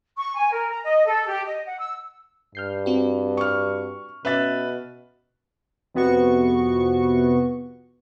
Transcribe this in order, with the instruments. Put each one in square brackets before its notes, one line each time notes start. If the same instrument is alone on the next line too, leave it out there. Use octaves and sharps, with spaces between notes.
[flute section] C#6
G#5
A#4
A#5
D#5
A4
G4
D#5
F#5
E6
[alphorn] G2 [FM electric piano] F6 G6 C7
[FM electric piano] C4 F#4
[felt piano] C#6 F6
[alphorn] B2 [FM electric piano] C#4 [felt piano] B4 E5 A6
[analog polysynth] F2 C3 B3 F#4 C#6